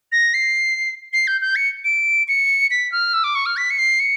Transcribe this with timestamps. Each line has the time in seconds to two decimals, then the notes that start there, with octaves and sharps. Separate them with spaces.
0.12 A#6
0.34 C7
1.13 C7
1.27 G6
1.41 G6
1.56 C#7
1.84 D7
2.28 C#7
2.71 B6
2.92 F6
3.14 E6
3.24 D6
3.35 C#6
3.46 F6
3.57 B6
3.70 C#7
3.79 C7
4.00 C#7